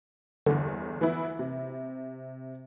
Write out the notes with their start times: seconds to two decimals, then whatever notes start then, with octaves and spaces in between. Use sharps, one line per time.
0.46 G1 E2 D3
1.01 E3 B3 E4
1.39 C3